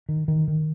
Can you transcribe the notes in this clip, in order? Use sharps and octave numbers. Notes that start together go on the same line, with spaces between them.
D#3
D#3
D#3